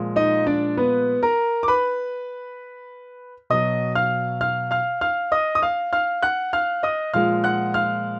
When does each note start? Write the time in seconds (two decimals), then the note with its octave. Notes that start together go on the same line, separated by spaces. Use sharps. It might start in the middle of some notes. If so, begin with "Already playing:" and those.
Already playing: A#2 F3 G#3
0.16 D#4 D#5
0.47 D4 D5
0.77 B3 B4
1.23 A#4 A#5
1.63 D6
1.68 B4 B5
3.50 B2 F#3 D#5 D#6
3.95 F5 F6
4.41 F5 F6
4.71 F5 F6
5.01 F5 F6
5.32 D#5 D#6
5.55 D#6
5.62 F5 F6
5.93 F5 F6
6.22 F#5 F#6
6.53 F5 F6
6.83 D#5 D#6
7.14 A#2 F3 G#3 F5 F6
7.44 F#5 F#6
7.74 F5 F6